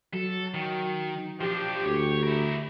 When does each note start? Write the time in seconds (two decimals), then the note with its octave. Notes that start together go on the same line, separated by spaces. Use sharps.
0.13 F#3 A4
0.54 D#3
1.41 F3 D4 G4
1.85 D2 C#5
2.23 E4 A#4